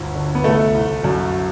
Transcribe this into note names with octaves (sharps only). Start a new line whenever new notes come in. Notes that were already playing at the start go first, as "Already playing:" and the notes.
Already playing: G1 D2
D3
B3
C2 A3
C2
F#2